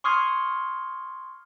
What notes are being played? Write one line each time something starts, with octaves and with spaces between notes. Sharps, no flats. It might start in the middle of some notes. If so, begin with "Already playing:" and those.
C6 C#6 D#6 F6 G#6 C7